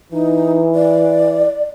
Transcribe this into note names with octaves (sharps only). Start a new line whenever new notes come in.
E3 D#4
D5